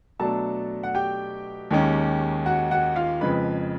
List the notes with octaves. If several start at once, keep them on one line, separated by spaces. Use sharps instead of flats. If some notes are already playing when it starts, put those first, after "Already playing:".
B2 F#3 A3 D4 A4 A5
F#5
G4 G5
D#2 D#3 G#3 C#4
F#4 F#5
F#4 F#5
F4 F5
F2 C#3 F3 G#3 B4 B5